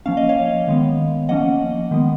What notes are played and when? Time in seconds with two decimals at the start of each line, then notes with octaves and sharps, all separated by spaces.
0.06 F3 A#3 C#4 F5
0.17 D#5
0.29 C#5 F5
0.68 D#3 G#3 B3
1.29 F3 A#3 C#4 D#5 F#5
1.91 D#3 G#3 B3